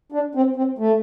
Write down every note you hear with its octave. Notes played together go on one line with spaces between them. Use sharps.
D4
C4
C4
A3